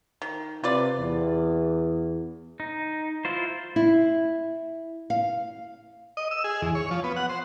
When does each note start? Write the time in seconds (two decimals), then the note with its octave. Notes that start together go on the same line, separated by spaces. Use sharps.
0.22 D#3
0.64 C3 F4 B4 D5
1.00 E2
2.60 D#4
3.25 E4 F4 C5
3.76 E4
5.10 F5
6.17 D#5
6.31 E6
6.44 G#4
6.62 E2
6.75 C#5
6.91 F3
7.04 B3
7.16 F#5
7.29 C5